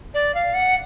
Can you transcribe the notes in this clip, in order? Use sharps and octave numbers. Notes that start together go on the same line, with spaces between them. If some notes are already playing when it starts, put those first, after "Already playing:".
D5
F5
F#5